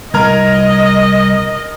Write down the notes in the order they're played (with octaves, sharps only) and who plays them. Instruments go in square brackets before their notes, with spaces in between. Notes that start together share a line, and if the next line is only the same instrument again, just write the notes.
[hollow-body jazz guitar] C2 A#5 [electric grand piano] A#4 F6 G#6 [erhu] D#5